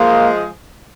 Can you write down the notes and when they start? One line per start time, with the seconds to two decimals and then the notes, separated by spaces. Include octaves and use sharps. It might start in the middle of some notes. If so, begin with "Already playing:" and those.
Already playing: F3 G#3 A#3